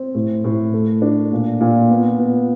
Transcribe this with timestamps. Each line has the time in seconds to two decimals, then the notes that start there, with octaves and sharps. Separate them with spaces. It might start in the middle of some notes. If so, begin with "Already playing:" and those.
Already playing: C4
0.15 A2
0.44 A2
0.74 A3
1.02 D4
1.32 A#2
1.61 A#2
1.90 B3
2.19 B3